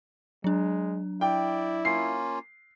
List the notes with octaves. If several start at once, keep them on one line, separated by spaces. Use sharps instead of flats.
F#3 G#3 D4
E4 D5 G5
A#3 C#4 F4 C7